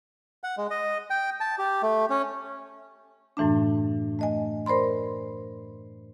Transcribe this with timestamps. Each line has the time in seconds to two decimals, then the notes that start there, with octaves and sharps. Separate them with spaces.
0.44 F#5
0.58 G#3
0.70 D#5
1.10 G5
1.40 A5
1.58 G4
1.83 A3
2.10 C#4
3.37 F#2 A2 E3 A3 D4
4.19 A3 D#5 G#5
4.66 A#4 C5 D5 B5 C6